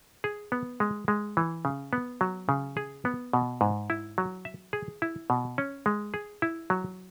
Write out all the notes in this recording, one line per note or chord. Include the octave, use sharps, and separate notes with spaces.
G#4
B3
G#3
G#3
E3
C#3
B3
F#3
C#3
G#4
B3
B2
G#2
E4
F#3
E5
G#4
E4
B2
C#4
G#3
G#4
E4
F#3